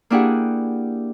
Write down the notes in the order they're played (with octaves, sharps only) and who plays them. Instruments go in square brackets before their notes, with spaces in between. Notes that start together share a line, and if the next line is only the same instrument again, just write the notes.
[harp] A#3 D4 E4 G4 G#4 F#5